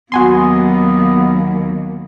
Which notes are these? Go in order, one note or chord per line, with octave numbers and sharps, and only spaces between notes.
D#2 F#3 B3 F#4 G#5 C6